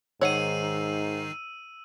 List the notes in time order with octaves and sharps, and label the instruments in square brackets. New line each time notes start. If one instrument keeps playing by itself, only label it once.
[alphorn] G#2 [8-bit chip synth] D#3 D#4 C7 [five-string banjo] C#5 F#5 [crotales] E6 D#7